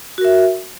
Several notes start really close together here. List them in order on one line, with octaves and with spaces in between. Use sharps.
F#4 A#4 E5